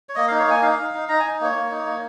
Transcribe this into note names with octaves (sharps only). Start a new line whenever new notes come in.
C#5
A#3 D#5
D#4 F5
C#5
A#3 G#5
D#4 F5
D#4
D#4
D#4 A#5
D#4 G#5
A#3 C#5
A#3
D#4
A#3